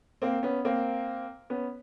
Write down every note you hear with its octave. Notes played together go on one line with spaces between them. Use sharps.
A#3 C4
B3 C#4
A#3 C4
B3 C#4